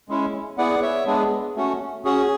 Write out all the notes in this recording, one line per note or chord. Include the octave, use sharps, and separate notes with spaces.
G#3 C#4 E4
B3 E4 G#4 D5 F#5
C#5 E5
G#3 B3 D4 G#4
A3 C#4 F#4
C#4 F#4 G#4